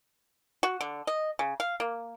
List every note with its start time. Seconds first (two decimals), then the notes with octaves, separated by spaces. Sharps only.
0.63 F#4
0.81 D3
1.07 D#5
1.39 C#3
1.60 F5
1.80 A#3